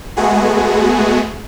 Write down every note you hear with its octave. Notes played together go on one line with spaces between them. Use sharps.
G#3 A3 B3 F#4 G#4